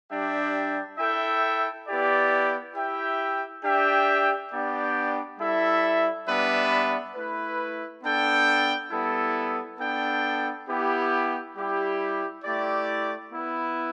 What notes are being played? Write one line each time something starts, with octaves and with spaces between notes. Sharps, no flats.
G3 D4 G4 E5 G5
E4 A4 E5 G5
B3 E4 G4 D5
E4 G4 E5 G5
D4 G4 E5 G5
B3 D4 G4 D5 G5
G3 E4 A4 E5
G3 B3 D4 B4 E5
A3 E4 B4
B3 D4 A4 G5
G3 B3 E4 A4
B3 D4 A4 G5
B3 E4 G4
G3 E4 G4
A3 E4 G4 D5
B3 E4 B4